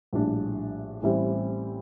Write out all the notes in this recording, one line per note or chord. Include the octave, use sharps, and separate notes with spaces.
A#1 A2 G3 D4
A1 A2 E3 G3 C4